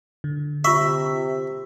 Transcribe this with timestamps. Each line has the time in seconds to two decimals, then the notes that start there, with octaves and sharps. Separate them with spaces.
0.24 D3
0.65 C3 F4 E5 C#6